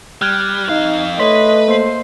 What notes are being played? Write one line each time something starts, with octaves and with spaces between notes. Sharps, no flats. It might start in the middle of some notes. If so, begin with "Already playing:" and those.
G3 F6 F#6 G#6
F2 D#4 F5
A3 B4 C#5 D#5 B5 C6 B6
A#3 C5 C7